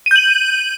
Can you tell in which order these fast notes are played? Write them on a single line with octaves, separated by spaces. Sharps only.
D#7 G6 F#7